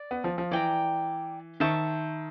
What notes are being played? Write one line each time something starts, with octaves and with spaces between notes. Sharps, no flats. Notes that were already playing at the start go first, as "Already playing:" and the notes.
Already playing: D5
B3
F3
F3
E3 D5 G5 A#5
D#3 C5 E5 A5 C#6